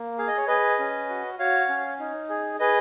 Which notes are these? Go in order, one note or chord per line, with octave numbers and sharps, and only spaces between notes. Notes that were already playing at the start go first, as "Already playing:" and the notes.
Already playing: A#3
G#4 F5
D#5
C#5
G#4 B4 D#5
C#4
F#4
F#4 C#5 F5
C#4
D#4
G#4
G#4 B4 D#5